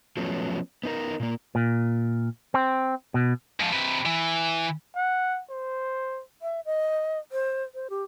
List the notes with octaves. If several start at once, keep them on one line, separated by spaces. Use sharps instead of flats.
F3 F#3 A3 B3 C#4
B3 D#4 A#4
A#2 A#3
A#2
C4
B2
G#2 F3
C3 B4
E3
F#5
C5
E5
D#5
C5
C5
G4